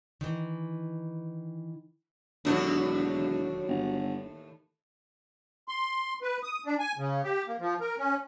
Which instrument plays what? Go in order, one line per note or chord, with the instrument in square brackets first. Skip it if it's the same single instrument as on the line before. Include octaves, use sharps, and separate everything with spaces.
[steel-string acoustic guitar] D#3 E3
[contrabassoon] E1 [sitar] D#2 A2 D4 [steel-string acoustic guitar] D3 F#3
[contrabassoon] G1
[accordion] C6
B4
D#6
D4
G#5
C#3
G4
A#3
F3
A#4
C#4